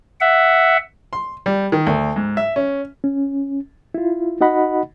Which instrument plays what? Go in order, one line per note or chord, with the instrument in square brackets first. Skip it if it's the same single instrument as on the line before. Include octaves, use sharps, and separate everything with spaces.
[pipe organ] E5 F#5
[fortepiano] C6
G3
D#3
D2
G#2
E5
C#4
[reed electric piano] C#4
E4 F4
D#4 F#4 D#5 F#5 B5